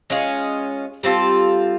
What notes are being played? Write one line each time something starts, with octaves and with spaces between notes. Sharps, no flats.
G#3 C#4 F4 G#4
G3 C4 F4 A4